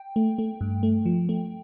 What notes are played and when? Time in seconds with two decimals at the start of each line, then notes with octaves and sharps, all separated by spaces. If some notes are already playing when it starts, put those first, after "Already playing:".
Already playing: G5
0.16 A3
0.38 A3
0.61 G2
0.83 A3
1.06 F3
1.29 A3